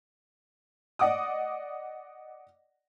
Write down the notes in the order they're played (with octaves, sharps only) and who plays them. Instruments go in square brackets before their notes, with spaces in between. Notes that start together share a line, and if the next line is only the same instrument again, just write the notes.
[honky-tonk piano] D5 D#5 F#5 D6 D#6